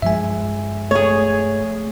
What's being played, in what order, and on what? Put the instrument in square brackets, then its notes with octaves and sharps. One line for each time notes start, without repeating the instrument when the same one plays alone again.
[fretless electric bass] G2 F3 G#3 [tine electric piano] E5 G#5
[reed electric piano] A3 [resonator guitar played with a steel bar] G#4 C#5